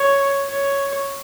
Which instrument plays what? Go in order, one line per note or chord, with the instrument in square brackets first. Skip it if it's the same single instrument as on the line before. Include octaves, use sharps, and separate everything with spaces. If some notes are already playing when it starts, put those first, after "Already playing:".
Already playing: [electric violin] C#5
C#5